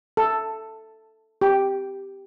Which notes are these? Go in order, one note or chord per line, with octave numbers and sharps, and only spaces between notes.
A4
G4